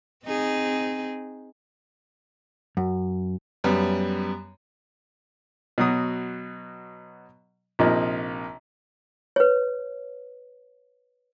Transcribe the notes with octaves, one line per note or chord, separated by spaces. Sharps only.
C4 D#4 G#4
F#2
F#2 G3 B3
B2 F#3 D#6
A#1 C3 F3 A#3 D#4
B4 C#5